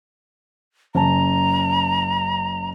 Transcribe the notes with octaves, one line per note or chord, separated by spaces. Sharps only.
F#1 C#4 A5 A#5